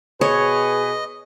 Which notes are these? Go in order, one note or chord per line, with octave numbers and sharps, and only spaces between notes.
B2 G#4 B4 C#5 D#5